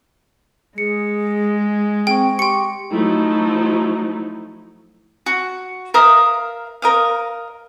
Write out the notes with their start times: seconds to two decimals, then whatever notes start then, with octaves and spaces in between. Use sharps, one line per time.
0.78 G#3 G#4 C#7
2.07 C4 G#4 G5 C#6
2.39 G4 G5 C6 C#6 C#7
2.91 F3 F#3 A3 D#4 E4
5.26 F#4
5.94 A#4 E5 F5 D#6
6.82 A#4 D#5 F5